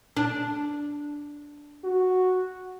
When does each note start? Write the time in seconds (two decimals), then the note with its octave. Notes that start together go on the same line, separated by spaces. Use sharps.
0.17 D4
1.84 F#4